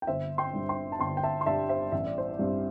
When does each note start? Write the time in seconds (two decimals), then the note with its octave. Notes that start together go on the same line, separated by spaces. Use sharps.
0.02 G5
0.07 G1 C5 E5
0.38 G5 C6
0.54 G2 G3
0.69 G5 C6
0.92 A5
1.00 G1 G5 C6
1.17 G5
1.23 E5 A5
1.41 C6
1.46 G2 G3 E5 A5
1.69 C5 E5
1.92 A1 E5
2.05 D5
2.18 C5
2.31 D5
2.39 G2 G3 C4